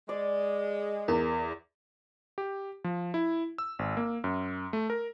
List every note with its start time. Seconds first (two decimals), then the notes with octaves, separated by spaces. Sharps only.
0.09 G#3 D5
1.08 E2 A#4
2.38 G4
2.84 F3
3.14 E4
3.58 E6
3.79 G#1
3.97 A#3
4.24 F#2
4.73 A3
4.90 A#4